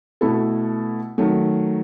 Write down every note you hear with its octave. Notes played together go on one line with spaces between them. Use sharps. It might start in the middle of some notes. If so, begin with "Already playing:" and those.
B2 A3 E4 A4
D#3 F#3 A3